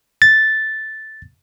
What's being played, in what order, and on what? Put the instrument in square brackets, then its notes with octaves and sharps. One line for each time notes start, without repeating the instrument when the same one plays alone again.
[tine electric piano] A6